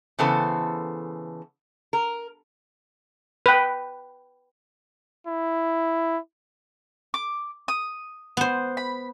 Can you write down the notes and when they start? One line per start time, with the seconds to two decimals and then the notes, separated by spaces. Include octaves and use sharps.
0.19 C#3 E3 B3 A4 C5
1.93 A#4
3.46 B4 G5
5.27 E4
7.14 D6
7.68 D#6
8.37 B3 C5
8.77 B5